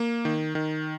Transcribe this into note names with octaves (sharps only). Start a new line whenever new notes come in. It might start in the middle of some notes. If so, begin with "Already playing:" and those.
Already playing: A#3
D#3
D#3